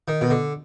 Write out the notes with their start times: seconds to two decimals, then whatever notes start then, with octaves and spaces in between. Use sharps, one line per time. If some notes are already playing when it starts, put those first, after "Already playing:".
0.08 D#3
0.21 B2
0.30 D3